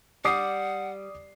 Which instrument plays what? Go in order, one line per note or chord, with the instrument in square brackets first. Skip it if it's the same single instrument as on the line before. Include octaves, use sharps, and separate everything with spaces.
[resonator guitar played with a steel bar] G3 [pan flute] F#5 [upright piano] D6 D#6 C7